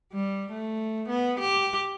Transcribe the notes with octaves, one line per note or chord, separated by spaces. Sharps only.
G3
A3
B3
G4